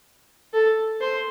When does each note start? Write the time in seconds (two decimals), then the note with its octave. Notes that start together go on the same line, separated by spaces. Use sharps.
0.53 A4
1.00 C5